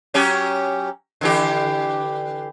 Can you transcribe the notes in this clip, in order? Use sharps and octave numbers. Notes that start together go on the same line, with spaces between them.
F#3 C#4 G4
D3 E3 G4